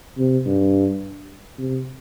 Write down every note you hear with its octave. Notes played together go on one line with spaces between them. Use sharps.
C3
G2
C3